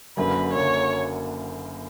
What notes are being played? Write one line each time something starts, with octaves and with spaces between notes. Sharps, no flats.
F#1 F#2 D3 F#3 A#3 B4
F#1 F#2 D3 F#3 A#3 C#5